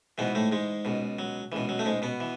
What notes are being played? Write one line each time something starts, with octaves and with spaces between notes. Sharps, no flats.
G#2 B2 E3 B3
A2 A3
G#2 G#3
C#2 B2
F#3
C#2 B2 E3
F#3
A3
G#2 G#3
B2 B3
E3